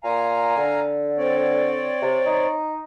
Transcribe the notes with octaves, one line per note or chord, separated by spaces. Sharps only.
A#2 F5 G#5 A#5
D3
C4 C#5 D5
C3
D#4